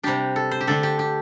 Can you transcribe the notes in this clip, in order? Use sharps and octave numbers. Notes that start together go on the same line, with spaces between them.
C3 G3 D4 G4
A4
C5
G4
D3 A3 D4 A4
G4
G4